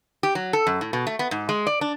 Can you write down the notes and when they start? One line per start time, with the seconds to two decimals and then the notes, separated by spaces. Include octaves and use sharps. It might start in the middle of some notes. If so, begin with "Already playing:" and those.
0.23 G4
0.35 F#3
0.53 A4
0.67 F#2
0.81 A2
0.93 B2
1.07 A3
1.19 B3
1.31 G#2
1.49 G#3
1.67 D5
1.81 D4